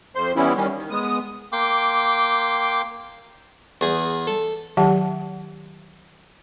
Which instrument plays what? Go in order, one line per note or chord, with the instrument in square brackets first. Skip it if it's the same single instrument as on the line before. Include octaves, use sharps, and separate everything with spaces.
[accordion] F2 C5 C6
E3 G3 B3 C#4 E4
D#3 G3 C#4
D#3
G#3 B3 D#6
[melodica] A#3 G5 C6 D6
[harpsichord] E2 G#4
A4
[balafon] D#3 F#3 G4 F#5 A5